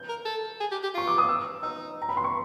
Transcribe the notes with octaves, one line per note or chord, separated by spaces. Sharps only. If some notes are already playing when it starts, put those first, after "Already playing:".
Already playing: G6
A#4
A4
G#4
G4
G4
F4 C#6
D6
D#6
E6
D#4 E6
A#5
B5
C6
C#6